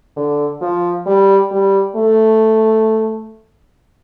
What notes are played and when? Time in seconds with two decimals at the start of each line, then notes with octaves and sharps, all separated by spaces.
0.17 D3
0.61 F3
1.06 G3
1.51 G3
1.96 A3